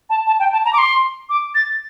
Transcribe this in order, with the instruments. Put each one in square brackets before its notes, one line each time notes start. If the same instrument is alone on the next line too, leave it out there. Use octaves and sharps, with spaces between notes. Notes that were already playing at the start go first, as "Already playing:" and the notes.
[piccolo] A5
A5
G5
A5
A#5
D6
C6
D6
A6